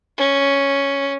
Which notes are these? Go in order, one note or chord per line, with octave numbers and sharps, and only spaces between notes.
C#4